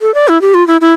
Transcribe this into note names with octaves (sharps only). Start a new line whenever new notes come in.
A4
D5
E4
G4
F4
E4
E4